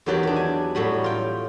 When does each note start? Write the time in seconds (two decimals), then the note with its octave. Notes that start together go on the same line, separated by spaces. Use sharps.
0.06 E2 D#3 F#3 G4 B4 D5
0.23 D4 B4
0.36 G#5
0.75 A2 F#3 G3 B5
1.04 F4 G5